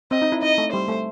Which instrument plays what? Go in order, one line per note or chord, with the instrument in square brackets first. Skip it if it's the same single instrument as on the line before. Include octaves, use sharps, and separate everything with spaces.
[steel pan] C4 [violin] D#5
[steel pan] D#4
E4
[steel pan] D#4 [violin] D#5
[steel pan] A3
[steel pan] G3 [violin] C5
[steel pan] A3